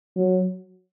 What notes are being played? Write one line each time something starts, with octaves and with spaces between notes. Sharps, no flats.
F#3